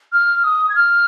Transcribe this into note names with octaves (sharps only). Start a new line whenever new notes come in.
F6
D#6
G#6
F6